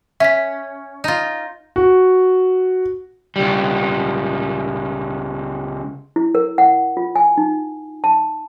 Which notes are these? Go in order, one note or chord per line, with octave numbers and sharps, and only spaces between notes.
C#4 E5 B6
D#4 F4
F#4
C#2 G3
E4
A#4
F#5
F4
G#5
D#4
A5